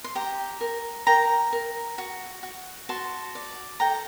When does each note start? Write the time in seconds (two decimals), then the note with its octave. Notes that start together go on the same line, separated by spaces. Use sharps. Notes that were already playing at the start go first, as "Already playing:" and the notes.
0.04 C6
0.15 G4 G5 A#5
0.61 A#4
1.07 A#4 G5 A#5
1.53 A#4
1.98 F#4
2.43 F#4
2.89 F#4 A5 C6
3.35 D5
3.80 A4 G5 A#5